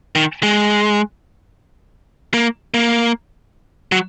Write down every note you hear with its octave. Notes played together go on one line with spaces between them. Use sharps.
D#3
G#3
A#3
A#3
F#3